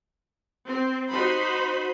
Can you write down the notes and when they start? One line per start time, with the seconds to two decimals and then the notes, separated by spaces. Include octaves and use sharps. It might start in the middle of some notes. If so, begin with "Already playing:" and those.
0.67 C4
1.10 D#4 F#4 C5 B5 C6